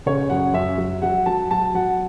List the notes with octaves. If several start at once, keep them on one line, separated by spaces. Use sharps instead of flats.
C#3 C#5
F#2 F#5
F#2 E5
F#3
F#3 F#5
F#3 A5
F#3 A5
F#3 F#5